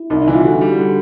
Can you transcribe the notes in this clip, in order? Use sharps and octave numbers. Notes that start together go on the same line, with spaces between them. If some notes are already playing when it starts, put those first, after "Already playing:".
Already playing: E4
C2 D#4
D#4
E3
F4
D3 F#4
G3
D3